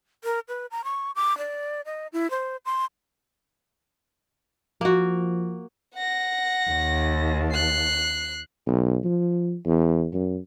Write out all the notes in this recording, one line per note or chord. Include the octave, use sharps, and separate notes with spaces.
A#4
B4
A#5
C#6
D6
D5
D#5
E4
C5
C6
F3 A#3 F#4
F#5 A#6
D#2
F#6 C7
B1
F3
E2
F#2